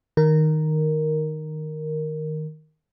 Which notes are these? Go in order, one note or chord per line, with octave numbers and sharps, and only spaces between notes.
D#3 A#4